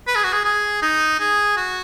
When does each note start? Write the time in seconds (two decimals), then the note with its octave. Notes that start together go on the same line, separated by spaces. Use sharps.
0.07 B4
0.15 G#4
0.24 F#4
0.33 G#4
0.44 G#4
0.82 D#4
1.20 G#4
1.57 F#4